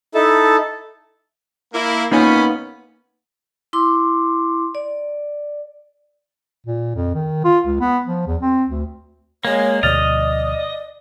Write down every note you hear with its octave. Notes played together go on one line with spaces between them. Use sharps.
D#4 E4 A4 A5
A#3 E4
A#2 A#3 B3 C#4 D#4 B5
E4 C6 D6
D5
A#2
F2
D#3
F4
C#2
B3
F3
E2
C4
D2
G#3 A#3 C#5
D2 B2 F3 D5 D#5 F6 A6 F7